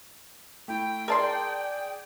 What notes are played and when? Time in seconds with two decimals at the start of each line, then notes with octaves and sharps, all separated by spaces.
0.68 A3 E4 G5
1.08 G#4 A#4 D5 A5 C6